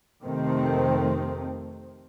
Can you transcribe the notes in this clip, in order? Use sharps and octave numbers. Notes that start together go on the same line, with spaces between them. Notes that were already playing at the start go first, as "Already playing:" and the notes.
F2 C3 D#3 A3 C4